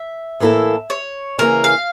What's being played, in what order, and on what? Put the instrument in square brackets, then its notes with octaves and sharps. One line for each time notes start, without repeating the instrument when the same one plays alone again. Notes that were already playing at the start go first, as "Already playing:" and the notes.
Already playing: [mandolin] E5
[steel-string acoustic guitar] A2 E3 A#3 E4 A4
[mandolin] C#5
[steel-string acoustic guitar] C#3 E3 A#3 C#4 [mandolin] A#4
[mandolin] F5